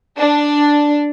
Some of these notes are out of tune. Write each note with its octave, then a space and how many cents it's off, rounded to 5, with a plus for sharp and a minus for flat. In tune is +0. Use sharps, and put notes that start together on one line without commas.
D4 +0